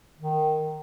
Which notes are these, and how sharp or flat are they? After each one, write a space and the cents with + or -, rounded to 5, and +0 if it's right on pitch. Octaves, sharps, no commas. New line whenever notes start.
D#3 -10